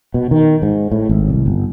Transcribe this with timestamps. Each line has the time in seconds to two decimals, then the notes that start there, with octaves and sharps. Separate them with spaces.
0.14 B2
0.31 D#3
0.62 G#2
0.92 A2
1.09 G#1
1.30 C2
1.46 G1